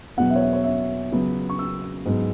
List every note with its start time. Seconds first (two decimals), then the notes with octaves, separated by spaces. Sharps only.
0.17 E2 B2 F#3 B3 F#5
0.30 E5
0.36 C#5
0.42 E5
0.53 C#5
0.64 E5
1.12 C#2 C#3 F#3 B3
1.49 C#6
1.59 E6
2.05 G#2 F#3 B3